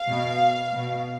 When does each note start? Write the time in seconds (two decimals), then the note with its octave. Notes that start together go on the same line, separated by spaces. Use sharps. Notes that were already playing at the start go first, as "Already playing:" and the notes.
Already playing: F5
0.11 B2
0.75 B2